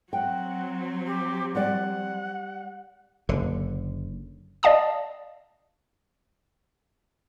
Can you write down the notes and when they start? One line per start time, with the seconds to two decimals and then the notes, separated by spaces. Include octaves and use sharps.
0.13 F#3 C4 F#5 G5
1.07 G4
1.55 G3 D5 F#5
3.29 F#1 D3
4.63 D5 D#5 F5 A5 D#6